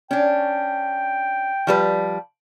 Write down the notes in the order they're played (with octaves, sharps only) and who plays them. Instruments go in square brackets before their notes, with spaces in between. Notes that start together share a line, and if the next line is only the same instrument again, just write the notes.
[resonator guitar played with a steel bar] C#4 D4 [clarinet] G5
[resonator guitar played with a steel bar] F3 G3 B4